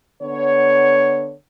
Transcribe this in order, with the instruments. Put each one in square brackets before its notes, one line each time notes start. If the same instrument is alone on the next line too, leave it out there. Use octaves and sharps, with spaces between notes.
[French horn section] D3 B3 C#5